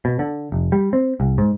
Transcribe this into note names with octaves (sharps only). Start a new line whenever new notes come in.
B2
D3
F1
G3
C4
C2
G#2